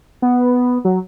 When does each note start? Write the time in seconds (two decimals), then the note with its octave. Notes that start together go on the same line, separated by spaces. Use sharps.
0.22 B3
0.85 F#3